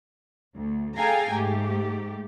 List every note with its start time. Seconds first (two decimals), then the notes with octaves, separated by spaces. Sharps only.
0.55 D2
0.96 G#4 A4 F5 G5 G#5 A#5
1.32 G#2 A3 G4